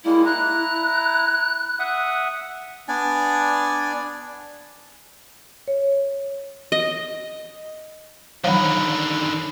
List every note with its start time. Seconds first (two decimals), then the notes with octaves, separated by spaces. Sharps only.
0.05 G3 G#3 A#3 E4
0.25 E4 A#5 F#6
1.79 E5 F#5 D#6
2.88 B3 D4 D5 G#5
5.68 C#5
6.72 D#5
8.44 D3 D#3 F3 F#3 C#5 B5